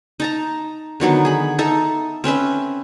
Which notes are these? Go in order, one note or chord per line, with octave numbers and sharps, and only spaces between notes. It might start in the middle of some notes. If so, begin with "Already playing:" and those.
D#4 A5 A#5
D3 D#3 F#3 B3
G#4 B5
D#4 A4 E5
C4 C#4 B4 E5